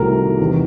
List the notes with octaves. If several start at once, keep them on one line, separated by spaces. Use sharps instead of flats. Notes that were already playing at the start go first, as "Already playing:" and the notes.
Already playing: C2 C3 D#3 F#3 A3 A#4
E2 C3 D#3